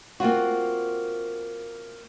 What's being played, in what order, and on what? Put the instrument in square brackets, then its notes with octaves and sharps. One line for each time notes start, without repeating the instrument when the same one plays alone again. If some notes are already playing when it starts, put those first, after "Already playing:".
[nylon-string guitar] A#3 C4 F4 F#4